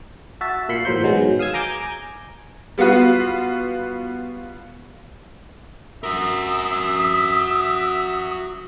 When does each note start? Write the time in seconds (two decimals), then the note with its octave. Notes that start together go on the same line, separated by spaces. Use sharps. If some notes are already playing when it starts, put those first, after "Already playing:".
0.41 F#4 E5 A5
0.69 A#2 F4 B5 C6 C7 C#7
0.85 A1 A2 F#3 A#4 C5 G6
1.03 B2 D#3 F#3 G#3 B3
1.39 F5 D#6 E6 G#6
1.53 G#5 A#5 D6 G6 G#6
2.78 G3 B3 F4 F#4 B4
6.03 F#4 A#4 E5 D#6